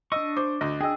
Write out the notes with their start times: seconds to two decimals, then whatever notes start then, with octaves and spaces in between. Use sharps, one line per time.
0.12 D4 D#5 C#6 E6
0.37 C5 D6
0.61 D2 D#5
0.81 D4 G#4 D#5 G5 E6